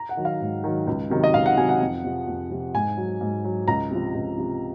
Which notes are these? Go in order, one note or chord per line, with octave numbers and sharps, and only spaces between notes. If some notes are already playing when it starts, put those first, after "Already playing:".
Already playing: A#5
F#5
D#3 F#3
F5
G#2
D#3 F#3
C#2
C3 D#3 F#3
D#5
C#2 F5
F#5
C3 D#3 F#3 G#5
F#5
F2
C3 F3
F2
C3 F3
G#2 G#5
F#3
G#2
F#3
C#2 A#5
C3 F3
C#2
C3 F3